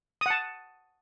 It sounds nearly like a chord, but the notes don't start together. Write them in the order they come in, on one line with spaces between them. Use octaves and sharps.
D#6 F#5 A5